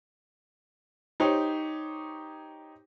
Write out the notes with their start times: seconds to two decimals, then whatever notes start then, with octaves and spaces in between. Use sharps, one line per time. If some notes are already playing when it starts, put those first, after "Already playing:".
1.20 D#4 G4 C5 C#5